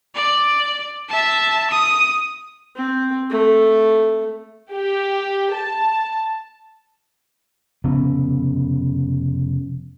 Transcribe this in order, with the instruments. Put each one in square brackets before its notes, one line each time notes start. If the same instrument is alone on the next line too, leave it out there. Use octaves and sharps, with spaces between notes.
[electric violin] D5
E5 A5
D#6
[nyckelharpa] C4
A3
[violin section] G4
A5
[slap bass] F1 C#3 B3